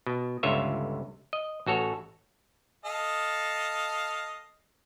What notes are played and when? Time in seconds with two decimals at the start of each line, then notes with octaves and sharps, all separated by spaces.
0.07 B2
0.43 G1 C#2 D3 F4 C#5 E5
1.33 D#5
1.66 A1 F#4 A4 C#5
2.85 A4 D#5 F5